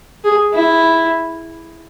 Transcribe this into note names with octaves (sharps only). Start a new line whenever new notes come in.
G#4
E4